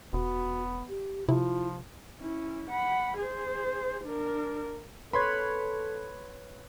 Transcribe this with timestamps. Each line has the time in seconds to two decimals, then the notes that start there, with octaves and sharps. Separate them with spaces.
0.13 E1 B3 F#4
0.89 G4
1.29 C3 F3 E4 F4
2.19 C#4 E4
2.70 F#5 B5
3.18 G#4 C5
4.04 D4 A#4
5.13 A4 B4 C#5 B5 C6 G#6